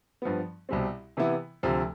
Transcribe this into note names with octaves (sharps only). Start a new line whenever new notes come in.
G2 F3 B3
C2 B2 G3 C4
C3 E3 B3 E4
D2 C3 F3